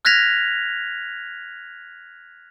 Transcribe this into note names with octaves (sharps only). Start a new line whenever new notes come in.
F6 F#6 G#6 A#6 B6 F7